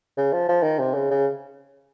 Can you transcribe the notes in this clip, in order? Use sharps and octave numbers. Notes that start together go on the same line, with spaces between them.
C#3
F3
F3
D#3
C3
C#3
C#3